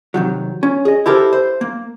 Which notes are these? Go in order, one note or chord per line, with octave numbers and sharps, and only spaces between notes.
C3 D#3 F#3
C#4
G#4 D#5
E4 G4 A4 A#4 C5
C5
A#3